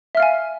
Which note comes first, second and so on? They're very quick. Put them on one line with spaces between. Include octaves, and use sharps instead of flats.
E5 F6 F5 G#5